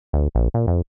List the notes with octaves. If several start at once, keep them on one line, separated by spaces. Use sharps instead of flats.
D2
A#1
A#2
F2